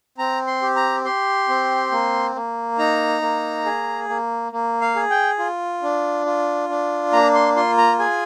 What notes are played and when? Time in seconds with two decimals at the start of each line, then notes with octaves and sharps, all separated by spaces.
0.18 C4 A#5
0.47 C6
0.62 G4
0.76 A#5
1.05 G4 C6
1.49 C4
1.92 A#3
2.35 A#3
2.78 D#4 A#5
3.22 A#3
3.65 G#4
4.09 A#3
4.52 A#3
4.81 F5
4.96 G#4
5.10 G5
5.39 F4
5.83 D4
6.26 F4
6.69 D4
7.12 A#3 A#5
7.34 C6
7.56 F4 C6
7.78 A#5
7.99 G#4 G#5